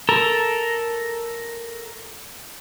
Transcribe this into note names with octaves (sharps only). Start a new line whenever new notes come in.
A4 A#4 A#5